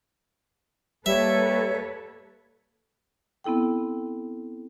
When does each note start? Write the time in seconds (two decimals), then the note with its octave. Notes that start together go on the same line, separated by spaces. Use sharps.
1.06 G3 A#3 A4 B4 C#5 E5
3.44 B3 C4 E4 A4 G5